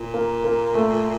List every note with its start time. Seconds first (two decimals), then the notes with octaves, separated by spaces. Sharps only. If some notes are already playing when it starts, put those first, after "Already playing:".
Already playing: A#2
0.14 A#3
0.44 A#3
0.74 A3